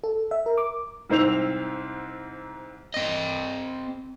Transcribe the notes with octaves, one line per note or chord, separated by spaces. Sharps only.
A4
E5
A#4
D6
C2 G#2 C4 C5 E6 F7
C4 D#5